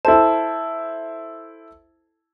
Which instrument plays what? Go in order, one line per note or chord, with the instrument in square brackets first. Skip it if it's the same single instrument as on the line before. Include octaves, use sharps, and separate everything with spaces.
[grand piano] E4 A4 C5 [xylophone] A5